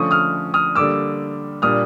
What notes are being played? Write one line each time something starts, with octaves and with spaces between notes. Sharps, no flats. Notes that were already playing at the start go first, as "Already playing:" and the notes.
Already playing: D3 F3 A3 C#4 C#6 D#6
D#6 F6
D#6 F6
D3 G3 A#3 D6 E6
A#2 G3 A#3 D4 D#6 F6